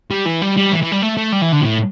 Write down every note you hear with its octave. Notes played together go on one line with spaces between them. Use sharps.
G3
E3
G3
G3
E3
E3
G3
A3
A3
G3
E3
D3
A2